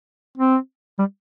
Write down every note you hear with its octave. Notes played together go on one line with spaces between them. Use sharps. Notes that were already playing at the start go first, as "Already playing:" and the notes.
C4
G3